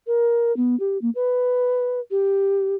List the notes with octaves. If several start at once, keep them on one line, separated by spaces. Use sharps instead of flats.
A#4
B3
G4
A#3
B4
G4